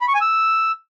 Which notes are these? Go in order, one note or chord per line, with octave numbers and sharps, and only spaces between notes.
B5
C#6
G#5
E6